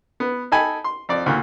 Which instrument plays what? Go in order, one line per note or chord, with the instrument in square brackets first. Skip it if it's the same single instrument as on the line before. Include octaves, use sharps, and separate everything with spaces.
[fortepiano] B3
D#4 A4 G5 G#5 B5
C6
F2 D5
D2 A#2